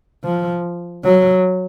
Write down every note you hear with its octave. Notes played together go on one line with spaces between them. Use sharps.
F3
F#3